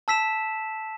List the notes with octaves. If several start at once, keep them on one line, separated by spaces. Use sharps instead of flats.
A5 E6 B6 E7